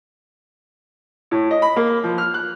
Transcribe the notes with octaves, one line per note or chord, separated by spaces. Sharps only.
A2
D#5
B5
A#3
F3
F6
F#6